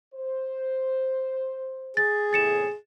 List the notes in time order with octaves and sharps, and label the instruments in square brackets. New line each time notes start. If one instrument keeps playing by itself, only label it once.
[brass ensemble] C5
[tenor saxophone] G#4 [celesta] A6
[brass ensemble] E2 A2 C3 [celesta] A6 C#7 E7